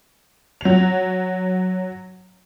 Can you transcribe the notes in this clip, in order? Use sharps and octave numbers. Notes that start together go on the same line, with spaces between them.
F#3 F7